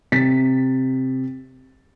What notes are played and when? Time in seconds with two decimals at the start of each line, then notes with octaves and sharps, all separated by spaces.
0.12 C3 A6 B6